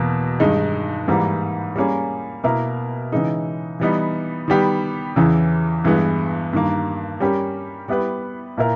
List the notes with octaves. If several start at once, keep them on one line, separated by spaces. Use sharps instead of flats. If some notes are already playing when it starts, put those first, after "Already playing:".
Already playing: E2 B2 A#3
G2 D#3 G#3 D#4
G#2 E3 G3 A#3
G3 A#3 C#4 G#4
B2 A#3 E4 A#4
C#3 E3 G#3 D#4
E3 G3 B3 D#4
D#3 G3 B3 G4
E2 C#3 E3
G2 E3 G#3 B3
G2 D#3 A#3
G3 C#4 G4 A#4
G3 B3 E4 G4 B4
A#2 A#3 E4 A#4